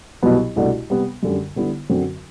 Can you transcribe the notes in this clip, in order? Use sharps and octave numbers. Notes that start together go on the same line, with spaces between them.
C2 B2 F#3 B3
C2 B2 A3 D4 F#4
C3 G3 B3
F#2 D3 G3
D3 G3 B3 E4
F#2 D3 F#3 C4 F#4